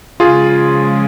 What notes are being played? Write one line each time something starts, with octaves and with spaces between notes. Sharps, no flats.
C#3 F3 G#3 F4 G#4